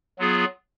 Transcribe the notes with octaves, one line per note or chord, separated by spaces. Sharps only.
F#3 B3 F4 G#4